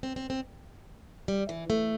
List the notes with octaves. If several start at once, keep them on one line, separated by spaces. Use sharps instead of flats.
C4
C4
C4
G3
E3
A3